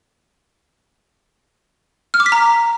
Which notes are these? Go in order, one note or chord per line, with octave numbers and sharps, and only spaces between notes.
F6
D6
B6
A#5